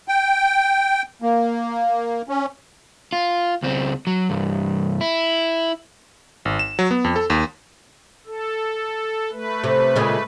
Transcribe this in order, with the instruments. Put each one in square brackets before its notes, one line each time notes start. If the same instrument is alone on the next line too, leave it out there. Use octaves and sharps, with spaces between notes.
[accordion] G5
A#3
C#4
[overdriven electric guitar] F4
C#2 C4
F#3
C2 G2
E4
[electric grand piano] G#1
E7
F#3
B3
F2
A4
D#2
[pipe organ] A4
A3 B4
[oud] C3
A#2 C#3 G#3